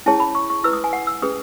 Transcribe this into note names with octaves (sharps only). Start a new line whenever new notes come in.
C#4 E4 G#4 C#5 A5
B5
C#6
C#6
E4 B4 E6
D#6
G#5
F#5
E6
C#4 G#4 B4 D#6